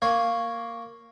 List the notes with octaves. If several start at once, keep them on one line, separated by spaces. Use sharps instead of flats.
A#3 C#5 F5